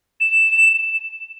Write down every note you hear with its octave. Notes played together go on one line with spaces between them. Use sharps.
E7